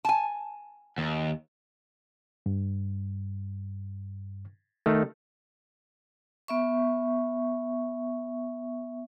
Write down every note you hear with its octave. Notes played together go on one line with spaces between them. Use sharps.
G#5 A5
D#2
G2
D#3 A3
B3 E5 C#6